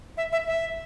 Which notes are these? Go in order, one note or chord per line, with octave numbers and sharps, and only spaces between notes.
E5
E5
E5